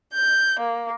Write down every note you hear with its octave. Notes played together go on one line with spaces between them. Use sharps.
G6
A#3